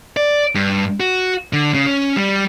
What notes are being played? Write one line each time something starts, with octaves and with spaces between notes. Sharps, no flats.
D5
G2
F#4
D3
C#3
C#4
G3